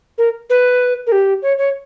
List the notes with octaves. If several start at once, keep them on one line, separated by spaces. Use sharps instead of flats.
A#4
B4
A#4
G4
C#5
C#5